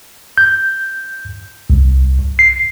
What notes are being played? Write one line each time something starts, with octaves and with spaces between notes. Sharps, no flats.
G6
C2
C7